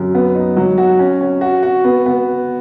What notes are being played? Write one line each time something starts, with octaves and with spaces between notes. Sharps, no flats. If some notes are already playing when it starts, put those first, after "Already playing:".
Already playing: F#2
B3
D#4
F#3
F#4
C#4
C#4
F#4
F#4
B3
B3